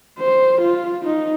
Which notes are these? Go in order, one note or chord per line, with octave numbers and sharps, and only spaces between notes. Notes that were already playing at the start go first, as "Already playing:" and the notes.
C5
F4
D#4